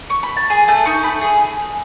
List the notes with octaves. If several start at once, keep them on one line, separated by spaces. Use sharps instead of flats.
C#6
B5
A5
G#4 G#5
A3 A5
D#4 C#6
A3 B5
G#4